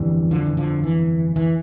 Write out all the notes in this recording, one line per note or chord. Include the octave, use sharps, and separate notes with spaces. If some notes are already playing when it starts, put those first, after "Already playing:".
Already playing: G1 F2 D3 E3 G3
D3 F3
E3
D3 F3
E3
E3